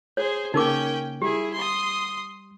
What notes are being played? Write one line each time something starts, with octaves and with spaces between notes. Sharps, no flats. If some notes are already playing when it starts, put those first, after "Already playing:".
G#4 C5 C#5
C#3 A#3 C#4 D#4 A#4 G5 D6
G3 E4 G4 G#4
C6 D#6